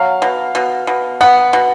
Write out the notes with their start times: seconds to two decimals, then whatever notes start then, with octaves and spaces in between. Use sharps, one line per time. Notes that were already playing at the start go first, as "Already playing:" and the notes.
Already playing: F#3 F5
0.22 B2
0.55 B2
0.87 B2
1.21 B3 F#5
1.53 B2